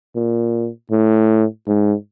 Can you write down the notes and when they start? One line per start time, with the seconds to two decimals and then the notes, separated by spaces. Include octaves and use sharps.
0.16 A#2
0.91 A2
1.68 G#2